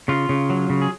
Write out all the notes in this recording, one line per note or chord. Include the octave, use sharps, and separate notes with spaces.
C#3 F4
C#3
F#3
C#3
G#4